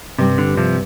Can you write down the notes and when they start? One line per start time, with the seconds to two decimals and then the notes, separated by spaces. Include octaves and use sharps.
0.19 G2 C3 G3 C4
0.38 D3
0.57 C3 F3